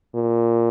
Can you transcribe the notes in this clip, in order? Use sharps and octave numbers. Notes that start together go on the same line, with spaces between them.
A#2